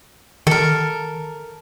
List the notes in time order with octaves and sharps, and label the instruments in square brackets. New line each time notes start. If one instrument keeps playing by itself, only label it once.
[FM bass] D#3 [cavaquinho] A4 A#4